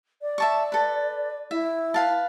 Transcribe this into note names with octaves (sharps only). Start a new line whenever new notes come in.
D5
E5 A5 C#6
A4 B4
E4 E5
B4 F5 A5